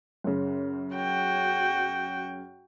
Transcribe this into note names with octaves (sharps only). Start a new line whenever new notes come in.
F#2 C#3
F#4 G5